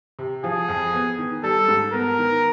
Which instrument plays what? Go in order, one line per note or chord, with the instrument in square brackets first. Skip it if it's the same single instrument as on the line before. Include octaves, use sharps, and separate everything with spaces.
[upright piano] C3
[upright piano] F3 [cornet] G#4
[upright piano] F2
B3
D#3
[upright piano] G3 [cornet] A4
[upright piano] G#2
[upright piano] B3 [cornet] A#4
[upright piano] D#3